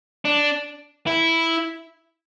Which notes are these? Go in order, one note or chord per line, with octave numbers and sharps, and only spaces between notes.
D4
E4